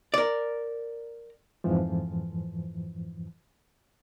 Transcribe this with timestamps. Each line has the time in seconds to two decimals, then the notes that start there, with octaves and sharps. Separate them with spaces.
0.14 A#4 D5
1.64 F2 G#2 E3 F3